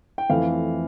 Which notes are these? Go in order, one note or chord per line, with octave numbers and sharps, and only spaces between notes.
G5
F2 E3 A3 F5